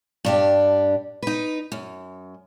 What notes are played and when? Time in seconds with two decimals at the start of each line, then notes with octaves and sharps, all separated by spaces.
0.25 G2 D4 G4
1.22 D#4 B4
1.72 F#2